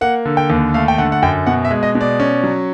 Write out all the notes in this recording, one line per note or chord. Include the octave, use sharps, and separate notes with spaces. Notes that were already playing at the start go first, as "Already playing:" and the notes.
A#3 F#5
D3
G5
D#2
A3 F5
G5
D3 F#5
F#5
F#2 G5
B2 F#5
E5
G#3
D#5
B2
D5
C#4
F#3